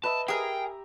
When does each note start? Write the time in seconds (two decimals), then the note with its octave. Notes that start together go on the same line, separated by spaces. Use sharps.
0.04 B4 D#5 E5 A5
0.28 G4 G#4 A#4 E5 G5 A#5